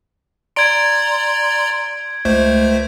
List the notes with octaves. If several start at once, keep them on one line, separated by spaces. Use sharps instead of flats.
D5 A#5 C6 G#6 D7
C#2 A3 C5